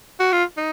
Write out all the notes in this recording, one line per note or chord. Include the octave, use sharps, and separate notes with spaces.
F#4
F4
D#4